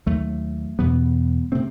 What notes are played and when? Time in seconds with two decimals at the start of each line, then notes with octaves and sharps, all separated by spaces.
0.06 D#2 F#3 A3
0.79 E2 B2 G3 B3
1.52 C3 A3 C4